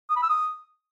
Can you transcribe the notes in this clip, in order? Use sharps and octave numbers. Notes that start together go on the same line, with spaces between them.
D#6
B5
E6
D#6